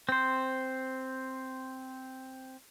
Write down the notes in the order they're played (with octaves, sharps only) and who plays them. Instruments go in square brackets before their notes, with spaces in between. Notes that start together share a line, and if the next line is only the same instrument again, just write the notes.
[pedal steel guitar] C4 C5